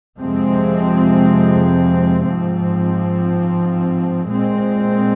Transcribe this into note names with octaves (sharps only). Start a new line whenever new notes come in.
F2 C3 F3 G#3 C4
G#2 F3 C4
A#2 G#3 C4